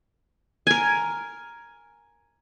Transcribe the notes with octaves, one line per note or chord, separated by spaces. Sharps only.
A#4 G#5